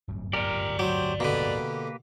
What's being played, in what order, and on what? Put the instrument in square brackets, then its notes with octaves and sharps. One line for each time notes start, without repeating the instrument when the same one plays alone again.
[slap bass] D1 G1 F#2
[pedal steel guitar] G4 A#4 [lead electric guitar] D5 G#5
[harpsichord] F#3 [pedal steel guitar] G4 C5
[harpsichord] B2 D3 [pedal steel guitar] A#3 G4 B4